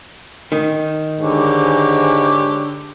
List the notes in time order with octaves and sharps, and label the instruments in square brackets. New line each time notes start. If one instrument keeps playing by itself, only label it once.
[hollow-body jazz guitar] D#3
[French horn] G#2 [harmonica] D3 G4 C#5